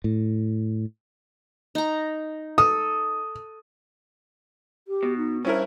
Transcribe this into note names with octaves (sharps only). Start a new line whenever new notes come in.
A2
D#4 A#5
A4 D#6
G4
B2
D#4
G2 C#4 E4 A#4 C5